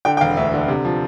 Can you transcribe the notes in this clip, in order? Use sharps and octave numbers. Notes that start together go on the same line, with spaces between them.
D3 G5
G5
E1 F5
D2 E5
D3
C3
F3